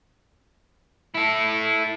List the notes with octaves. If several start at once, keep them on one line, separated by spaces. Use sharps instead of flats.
E4 A4